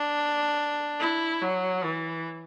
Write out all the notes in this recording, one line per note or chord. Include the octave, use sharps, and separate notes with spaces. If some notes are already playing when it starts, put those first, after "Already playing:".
Already playing: D4
E4
F#3
E3